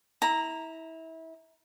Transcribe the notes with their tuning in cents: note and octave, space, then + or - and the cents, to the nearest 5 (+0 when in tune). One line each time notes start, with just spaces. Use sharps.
E4 -25 A#5 +0